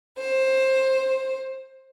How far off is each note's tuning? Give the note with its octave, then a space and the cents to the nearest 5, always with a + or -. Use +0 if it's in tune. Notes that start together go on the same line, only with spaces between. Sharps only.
C5 +15